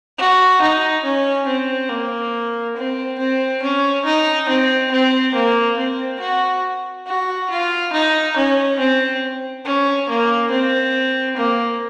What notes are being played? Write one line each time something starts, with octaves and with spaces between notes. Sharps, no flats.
F#4
D#4
C#4
C4
A#3
C4
C4
C#4
D#4
C4
C4
A#3
C4
F#4
F#4
F4
D#4
C#4
C4
C#4
A#3
C4
A#3